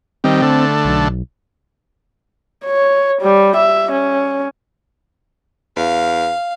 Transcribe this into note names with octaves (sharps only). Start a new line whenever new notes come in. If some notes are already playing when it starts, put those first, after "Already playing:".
D#3 G3 C4
D3 A3
B1
C#5
G3
E5
C#4
E2 F5